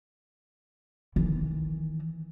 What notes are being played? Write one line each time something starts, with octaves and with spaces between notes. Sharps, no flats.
D#3 E3